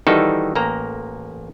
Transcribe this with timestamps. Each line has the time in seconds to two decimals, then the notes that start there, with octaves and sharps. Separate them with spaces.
0.07 D#3 E3 G3 D#4 F#4 A4
0.55 A1 A#3 A#5